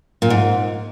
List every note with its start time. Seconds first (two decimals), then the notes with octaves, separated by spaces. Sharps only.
0.22 A#2
0.30 G#2